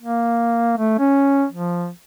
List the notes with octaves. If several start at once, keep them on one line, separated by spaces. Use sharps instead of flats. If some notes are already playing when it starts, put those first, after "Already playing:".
A#3
A3
C#4
F3